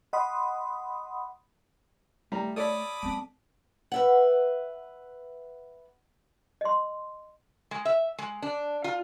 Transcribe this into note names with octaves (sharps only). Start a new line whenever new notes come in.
D#5 F#5 B5 C6 D#6
G3 A3 A#5
A4 C#5 D5 B5 D6 D#6
G#3 C4 A5
B4 E5 F#5
D#5 C6
G#3
E5
G#3
D4
F4